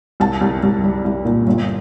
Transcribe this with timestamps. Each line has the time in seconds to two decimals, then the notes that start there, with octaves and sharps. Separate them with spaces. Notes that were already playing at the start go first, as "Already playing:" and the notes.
0.20 C2 A5
0.41 C2
0.63 C2
0.84 G3
1.05 C2
1.25 A#2
1.47 G1